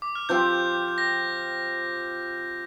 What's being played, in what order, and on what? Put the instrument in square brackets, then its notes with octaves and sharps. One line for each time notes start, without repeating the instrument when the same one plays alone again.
[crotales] D6
F6
[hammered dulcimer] F3 C4 G4 [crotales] G6
[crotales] G6
A#6